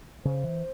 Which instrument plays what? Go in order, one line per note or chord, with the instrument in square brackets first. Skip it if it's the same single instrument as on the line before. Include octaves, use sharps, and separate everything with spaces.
[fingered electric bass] C#3 [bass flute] C5
[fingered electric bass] E3